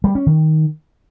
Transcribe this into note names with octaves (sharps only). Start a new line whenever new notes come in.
G3
C#4
D#3